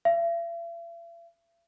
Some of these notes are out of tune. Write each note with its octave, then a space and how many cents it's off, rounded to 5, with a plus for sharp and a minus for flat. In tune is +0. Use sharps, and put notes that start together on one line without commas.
E5 +45